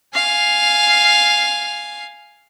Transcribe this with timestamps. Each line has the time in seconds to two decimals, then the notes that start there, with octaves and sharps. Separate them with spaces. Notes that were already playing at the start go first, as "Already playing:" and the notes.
0.14 F5 G#5